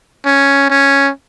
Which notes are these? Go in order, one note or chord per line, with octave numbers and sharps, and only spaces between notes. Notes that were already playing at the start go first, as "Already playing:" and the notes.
C#4
C#4